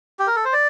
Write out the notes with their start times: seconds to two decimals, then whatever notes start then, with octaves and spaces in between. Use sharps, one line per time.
0.19 G4
0.27 A#4
0.36 A4
0.45 C5
0.53 D5